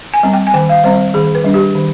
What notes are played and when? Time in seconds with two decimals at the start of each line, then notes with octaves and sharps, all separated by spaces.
0.14 G#5
0.23 G3 C4
0.33 G5
0.47 G#5
0.54 D#3 G5
0.69 F5
0.84 G3 C4 C5
1.14 D#3 G#4
1.35 B4
1.44 G3 D4
1.54 G4
1.75 D#3